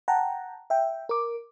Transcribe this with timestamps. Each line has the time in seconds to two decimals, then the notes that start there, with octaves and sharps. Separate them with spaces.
0.08 F#5 G5 A5 A#5
0.70 E5 G5
1.09 A#4 D6